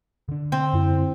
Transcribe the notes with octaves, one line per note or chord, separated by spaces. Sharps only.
D3 D4
C4
F#2 E4